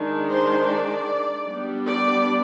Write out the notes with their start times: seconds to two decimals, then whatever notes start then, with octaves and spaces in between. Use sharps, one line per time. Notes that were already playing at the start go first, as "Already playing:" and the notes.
Already playing: D#3 G#3 D4
0.29 C5
0.69 D5
1.47 G3 B3 D4
1.86 D5